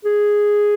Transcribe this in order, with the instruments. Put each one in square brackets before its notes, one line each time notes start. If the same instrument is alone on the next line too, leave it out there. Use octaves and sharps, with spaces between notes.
[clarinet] G#4